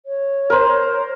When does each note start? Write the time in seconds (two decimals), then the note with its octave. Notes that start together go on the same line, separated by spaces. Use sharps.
0.06 C#5
0.50 A#4 C5